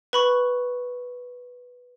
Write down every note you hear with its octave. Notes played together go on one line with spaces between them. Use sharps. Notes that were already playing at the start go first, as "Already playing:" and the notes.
B4 B5 C#6